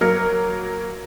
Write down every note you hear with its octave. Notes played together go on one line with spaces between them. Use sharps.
F#3 A#3 A#4 F6 C#7